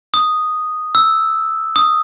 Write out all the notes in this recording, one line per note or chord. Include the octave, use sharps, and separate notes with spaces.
D#6
E6
D#6